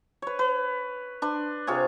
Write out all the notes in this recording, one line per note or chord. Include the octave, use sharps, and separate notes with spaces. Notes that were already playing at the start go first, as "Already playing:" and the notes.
B4 C#5
B4
D4 B4 C6
C3 F4 G#4 C#5